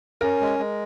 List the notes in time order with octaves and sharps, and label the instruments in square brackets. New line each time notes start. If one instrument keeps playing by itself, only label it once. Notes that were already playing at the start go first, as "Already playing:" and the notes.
[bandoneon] C#4 [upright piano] A#4
[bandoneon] G#3
G#3